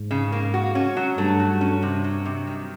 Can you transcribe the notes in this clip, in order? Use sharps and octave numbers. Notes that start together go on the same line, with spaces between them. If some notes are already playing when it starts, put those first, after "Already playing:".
Already playing: G#2
C#3
A#3
F#4
C#4
F#3
G2 A3
F#4
C#4
C3
F#3
C3
D#3